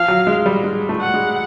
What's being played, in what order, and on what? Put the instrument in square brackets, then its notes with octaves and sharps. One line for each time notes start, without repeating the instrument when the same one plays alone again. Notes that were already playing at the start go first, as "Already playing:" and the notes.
Already playing: [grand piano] F3 [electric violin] F5
[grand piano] F#3
G#3
G3
G#3
A3
[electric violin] F#5
[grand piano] G#3